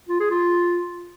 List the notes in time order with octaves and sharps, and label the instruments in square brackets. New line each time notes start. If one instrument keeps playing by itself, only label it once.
[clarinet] F4
G#4
F4